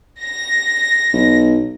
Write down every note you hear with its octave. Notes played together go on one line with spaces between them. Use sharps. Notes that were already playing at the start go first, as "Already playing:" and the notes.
A#6
B1